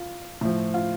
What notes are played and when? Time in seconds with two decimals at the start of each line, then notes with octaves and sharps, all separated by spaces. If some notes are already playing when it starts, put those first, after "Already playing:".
Already playing: F4
0.41 A2 F3
0.74 F4